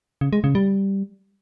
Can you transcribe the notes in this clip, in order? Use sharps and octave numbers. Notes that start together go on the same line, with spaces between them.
C#3
G#3
C#3
G3